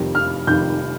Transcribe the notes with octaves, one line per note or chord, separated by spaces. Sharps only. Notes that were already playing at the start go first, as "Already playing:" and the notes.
Already playing: F1 F2 D#3 G3
F6
F1 F2 D#3 G3 G6